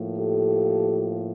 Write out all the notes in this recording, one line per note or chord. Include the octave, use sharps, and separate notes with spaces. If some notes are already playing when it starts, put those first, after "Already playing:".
Already playing: A2 F3 A#3
G4 A4